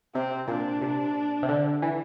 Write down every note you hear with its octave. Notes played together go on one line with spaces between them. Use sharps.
C3 C4
A#2 D4
C3
C3
D3
E3